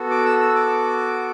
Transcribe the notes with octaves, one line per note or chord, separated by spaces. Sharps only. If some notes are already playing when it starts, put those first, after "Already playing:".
Already playing: B3 F#4 A4
D6
E6
E6
D6